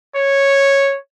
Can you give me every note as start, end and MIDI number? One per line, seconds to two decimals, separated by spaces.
0.16 0.97 73